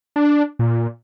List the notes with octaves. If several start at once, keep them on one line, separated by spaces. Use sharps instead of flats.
D4
A#2